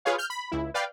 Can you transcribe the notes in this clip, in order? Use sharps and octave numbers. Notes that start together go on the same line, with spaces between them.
F4 G#4 B4 C#5 F5
F6 G6
B5
C#2 E4
B4 D5 F5 G5